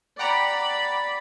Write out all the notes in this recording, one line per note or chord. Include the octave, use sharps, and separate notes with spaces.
D5 F#5 G5 A#5 B5